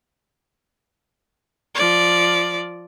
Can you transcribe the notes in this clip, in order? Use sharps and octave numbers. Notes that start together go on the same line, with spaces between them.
F3 D5